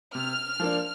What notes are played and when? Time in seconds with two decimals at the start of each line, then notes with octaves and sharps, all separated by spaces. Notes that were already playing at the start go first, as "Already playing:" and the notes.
0.15 C3 F6
0.60 F3 A#3 D4